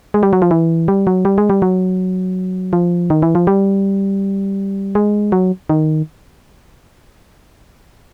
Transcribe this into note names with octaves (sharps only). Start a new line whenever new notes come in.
G#3
G3
F#3
F3
E3
G3
F#3
G3
G#3
G3
F#3
F3
D#3
E3
F3
G3
G#3
F#3
D#3